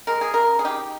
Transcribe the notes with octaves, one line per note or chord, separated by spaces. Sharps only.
G#3 A#4
G#4
C#3 A#4
G#4
D#4 G4